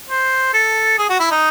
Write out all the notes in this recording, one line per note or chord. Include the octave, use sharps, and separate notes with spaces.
C5
A4
G#4
F#4
E4
D#4